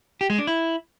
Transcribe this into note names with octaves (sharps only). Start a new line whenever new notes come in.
G4
G#3
D4
E4